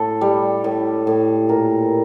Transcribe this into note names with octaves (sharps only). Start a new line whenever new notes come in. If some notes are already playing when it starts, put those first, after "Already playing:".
Already playing: A2 A4
G3
A2
A2
A#2 A#4